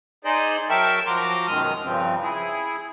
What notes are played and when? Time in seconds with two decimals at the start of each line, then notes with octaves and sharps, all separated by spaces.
0.25 D#4 G#4 C5 D5 D#5
0.70 F#3 A#4 E5 G5 A5 C#6
1.07 F3 F#4 A#5 C6 D6
1.47 F#2 B2 D#3 G#3 D#6 F6
1.83 G2 C#3 F3 C4
2.22 E4 G#4